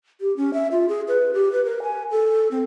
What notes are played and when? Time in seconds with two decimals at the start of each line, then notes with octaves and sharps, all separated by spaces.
0.21 G4
0.37 C#4
0.54 E5
0.72 F4
0.89 G#4
1.08 B4
1.34 G4
1.52 B4
1.65 A#4
1.83 G#5
2.11 A4
2.51 C4